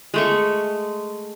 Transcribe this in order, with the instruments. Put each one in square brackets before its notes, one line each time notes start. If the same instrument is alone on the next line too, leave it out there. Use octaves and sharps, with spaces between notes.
[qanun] G#3 A3 C#6